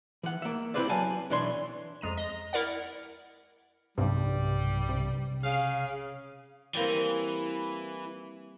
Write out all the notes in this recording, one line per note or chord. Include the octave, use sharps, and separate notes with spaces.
E3 F#5
A#3 E5
C4 E4 G4 B4 C5 D5
F#3 F5 G#5 A5
B1 E3 D4 C#5 C6
F2 G#3 A#5 D#7
D#5
E4 A#4 D5 F#5
B1 G2 C3 G3
C3
C#3 F5
E3 G3 A#3 C4